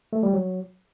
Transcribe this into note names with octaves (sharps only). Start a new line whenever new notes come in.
A3
G3
F#3